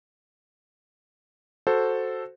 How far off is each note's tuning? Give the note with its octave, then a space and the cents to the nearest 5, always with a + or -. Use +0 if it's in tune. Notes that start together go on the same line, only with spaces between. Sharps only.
F#4 +0 A4 +0 C5 +0